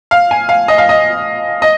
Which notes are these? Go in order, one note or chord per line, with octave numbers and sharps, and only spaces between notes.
F5
G#5
F5
D#5
F5
D#5
D#5